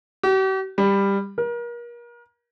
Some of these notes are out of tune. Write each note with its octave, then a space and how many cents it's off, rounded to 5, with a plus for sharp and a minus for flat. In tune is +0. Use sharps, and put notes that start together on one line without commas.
G4 -45
G3 +15
A#4 +35